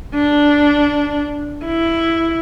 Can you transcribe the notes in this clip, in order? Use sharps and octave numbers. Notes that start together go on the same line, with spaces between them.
D4
E4